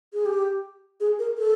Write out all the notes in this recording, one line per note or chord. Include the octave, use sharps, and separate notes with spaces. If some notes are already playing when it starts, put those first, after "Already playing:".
G#4
G4
G#4
A#4
A4